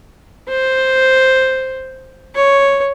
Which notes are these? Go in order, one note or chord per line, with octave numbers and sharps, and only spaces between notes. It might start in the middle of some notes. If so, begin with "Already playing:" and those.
C5
C#5